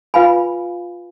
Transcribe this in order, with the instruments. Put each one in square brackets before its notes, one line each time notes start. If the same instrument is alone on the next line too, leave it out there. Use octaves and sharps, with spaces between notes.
[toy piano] F4 B4 F5 G#5 B5